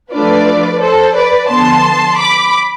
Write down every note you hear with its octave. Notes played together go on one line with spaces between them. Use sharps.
F3 A3 D4 F4 B4 D5
A4 C5
B4 D5
D3 F3 B3 A5 C6
B5 D6